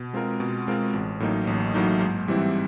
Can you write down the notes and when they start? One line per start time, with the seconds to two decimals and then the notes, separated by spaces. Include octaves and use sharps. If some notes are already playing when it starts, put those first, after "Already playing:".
Already playing: B2
0.14 G#3 C4 F4 A#4
0.40 B2
0.68 G#3 C4 F4 A#4
0.93 A1
1.20 A2 F#3 A#3 D#4
1.47 A1
1.74 A2 F#3 A#3 D#4
2.00 G#2
2.28 E3 G3 C4 E4